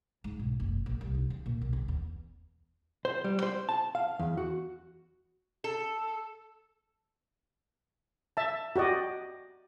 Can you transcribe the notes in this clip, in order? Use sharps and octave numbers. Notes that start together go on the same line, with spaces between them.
G#2
B1
F#1
A#1
C2
D#4
E2
A#2
B1
G1
E2
C5
G3
C5
A5
F5
E2
F#4
A4
E5 A5
F#4 G4 D5 D#5